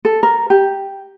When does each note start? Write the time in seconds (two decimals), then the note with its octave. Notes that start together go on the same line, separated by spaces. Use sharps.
0.05 A4
0.23 A#4
0.50 G4